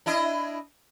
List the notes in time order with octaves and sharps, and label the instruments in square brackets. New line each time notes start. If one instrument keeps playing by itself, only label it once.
[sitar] D4 E4 D#5